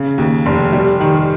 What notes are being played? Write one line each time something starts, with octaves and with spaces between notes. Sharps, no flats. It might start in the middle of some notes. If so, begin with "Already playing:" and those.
Already playing: C#3
D#2
F1
G3
D#3